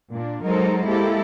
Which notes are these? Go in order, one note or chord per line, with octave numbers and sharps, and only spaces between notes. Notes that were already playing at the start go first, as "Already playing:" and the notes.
A#2 D4
F#3 G#3 D#4 A4 A#4 C5
G#3 A#3 E4 G4 A4